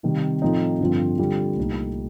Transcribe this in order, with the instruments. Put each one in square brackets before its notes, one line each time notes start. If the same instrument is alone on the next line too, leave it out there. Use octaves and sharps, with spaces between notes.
[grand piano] C3 D#3 G3 C4
A2 F3 A3 C4 D#4
G2 D3 F3 C4 F4
D3 G3 C4 F4
C2 A#2 A3 D#4 G4